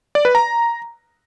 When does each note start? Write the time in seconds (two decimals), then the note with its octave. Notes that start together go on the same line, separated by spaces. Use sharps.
0.15 D5
0.25 B4
0.35 A#5